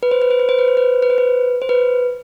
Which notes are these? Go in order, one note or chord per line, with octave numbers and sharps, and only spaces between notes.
B4
C5
B4
C5
B4
C5
B4
C5
B4
B4
C5
B4
C5
B4